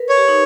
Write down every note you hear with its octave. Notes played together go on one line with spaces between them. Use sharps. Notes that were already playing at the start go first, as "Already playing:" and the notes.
Already playing: A#4 B4
C#5
G4
D#4